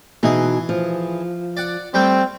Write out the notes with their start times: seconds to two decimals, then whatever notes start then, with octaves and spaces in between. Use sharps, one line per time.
0.23 B2 E3 D#4 G#4
0.69 F3
1.57 D5 F#5
1.94 G3 A3 C4 G5